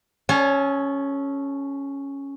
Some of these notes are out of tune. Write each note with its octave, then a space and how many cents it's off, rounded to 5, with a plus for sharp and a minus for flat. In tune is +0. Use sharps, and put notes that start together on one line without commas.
C#4 +0 A4 -35